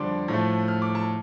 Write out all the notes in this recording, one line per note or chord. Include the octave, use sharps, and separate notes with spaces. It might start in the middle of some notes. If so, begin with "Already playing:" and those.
Already playing: F2 D3 G3 D4 C6 D6
A2 F3 A3
F6
D6
A5